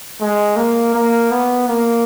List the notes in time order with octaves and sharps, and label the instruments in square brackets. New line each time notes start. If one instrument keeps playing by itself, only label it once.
[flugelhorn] G#3
A#3
A#3
B3
A#3